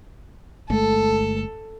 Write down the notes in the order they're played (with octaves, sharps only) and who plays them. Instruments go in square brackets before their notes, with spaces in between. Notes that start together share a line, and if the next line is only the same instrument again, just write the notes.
[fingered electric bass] G1 G#3 A3 [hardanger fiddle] A4